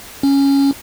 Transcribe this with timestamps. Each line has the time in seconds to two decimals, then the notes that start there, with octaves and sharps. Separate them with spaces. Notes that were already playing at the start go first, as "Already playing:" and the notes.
0.23 C#4